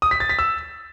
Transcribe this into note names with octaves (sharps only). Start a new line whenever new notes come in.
D#6
B6
A6
B6
E6